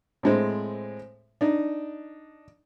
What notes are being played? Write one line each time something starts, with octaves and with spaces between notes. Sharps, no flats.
A2 G#3 C4
D4 D#4